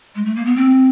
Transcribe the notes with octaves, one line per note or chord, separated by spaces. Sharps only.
G#3
A3
A#3
B3
C4